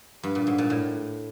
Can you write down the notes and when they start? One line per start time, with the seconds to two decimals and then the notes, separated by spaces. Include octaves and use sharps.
0.23 G2
0.35 A#2
0.47 G#2
0.58 A#2
0.70 A2